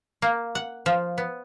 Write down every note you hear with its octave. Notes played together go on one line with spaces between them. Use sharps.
A#3
F#5
F3
B3